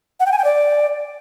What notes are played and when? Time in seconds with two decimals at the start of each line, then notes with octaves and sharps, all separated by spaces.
0.20 F#5
0.26 G5
0.32 G#5
0.38 G5
0.44 D5